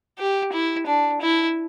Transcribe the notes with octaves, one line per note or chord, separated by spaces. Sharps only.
G4
E4
D4
E4